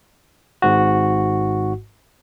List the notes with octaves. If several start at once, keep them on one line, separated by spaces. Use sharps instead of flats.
G#1 G#2 F#4